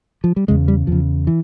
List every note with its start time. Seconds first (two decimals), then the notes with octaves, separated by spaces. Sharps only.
0.24 F3
0.36 G3
0.48 E2 C#3 G#3
0.68 G3
0.87 E2 C#3 F3
1.27 E3